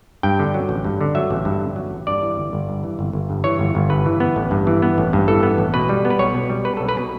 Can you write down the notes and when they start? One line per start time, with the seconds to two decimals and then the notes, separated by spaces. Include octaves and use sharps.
0.23 G2 G5
0.39 D3
0.54 F#3
0.69 A1
0.84 G2
1.01 D3
1.15 F#3 E5
1.30 A1
1.45 G2
1.61 D3
1.76 F#3
1.91 A1
2.07 G2 D5
2.22 E3
2.38 G1
2.53 G1
2.69 G2
2.84 E3
2.99 G1
3.13 G1
3.30 G2
3.44 E3 C#5
3.59 G1
3.75 G1
3.90 G2 B4
4.06 E3
4.20 B3
4.36 A1
4.51 G2
4.67 E3
4.82 B3
4.98 A1
5.13 G2
5.28 E3 A4
5.43 B3
5.58 A1
5.74 B2 B4
5.89 G3
6.05 B3
6.10 B4
6.19 B1 C#5
6.35 B2
6.50 G3
6.65 B3 B4
6.77 A4
6.81 B1
6.89 B4
6.97 B2